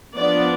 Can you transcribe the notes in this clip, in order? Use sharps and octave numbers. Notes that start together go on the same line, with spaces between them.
F3 B3 D4 D5